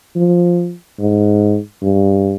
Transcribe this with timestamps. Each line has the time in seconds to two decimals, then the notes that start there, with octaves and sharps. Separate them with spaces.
0.16 F3
0.99 G#2
1.82 G2